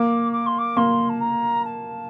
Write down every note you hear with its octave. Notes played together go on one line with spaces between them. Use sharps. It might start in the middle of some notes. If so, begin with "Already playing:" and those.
Already playing: A#3 D6
D6
C6
D6
A#3 C6
A5
A#5
A5